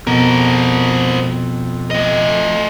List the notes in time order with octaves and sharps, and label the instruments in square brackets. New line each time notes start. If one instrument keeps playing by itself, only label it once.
[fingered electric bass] F2 [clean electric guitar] B2 [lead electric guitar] C4 A#4
[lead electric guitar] A3 D#5